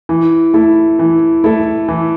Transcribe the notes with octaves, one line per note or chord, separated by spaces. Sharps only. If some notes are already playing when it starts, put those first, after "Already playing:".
E3
A3 E4 A4
E3
A3 E4 A4
E3